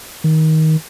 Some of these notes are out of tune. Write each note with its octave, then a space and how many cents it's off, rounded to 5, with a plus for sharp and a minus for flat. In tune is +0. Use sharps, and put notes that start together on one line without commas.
D#3 +20